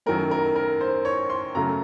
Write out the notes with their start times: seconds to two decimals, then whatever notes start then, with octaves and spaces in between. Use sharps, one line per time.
0.06 F#2 D#3 F#3 A3 A#4
0.31 A#4
0.56 A#4
0.81 C5
1.05 C#5
1.30 C6
1.55 F#2 C#3 F#3 A3 A#5